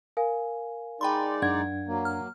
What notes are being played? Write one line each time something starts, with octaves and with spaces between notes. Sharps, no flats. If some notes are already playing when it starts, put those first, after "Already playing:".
A#4 F5 G#5
G#3 D#4 D5 G5 B5 C6
F#2 D4 F#5 G#6
F#3 A#3
F6